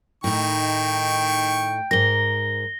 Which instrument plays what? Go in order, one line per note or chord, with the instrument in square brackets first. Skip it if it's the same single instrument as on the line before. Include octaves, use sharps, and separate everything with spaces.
[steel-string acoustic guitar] A2 D#4 [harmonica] D#3 C#6 [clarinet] G5
[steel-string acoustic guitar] G#2 A#4 [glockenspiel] A#6 G7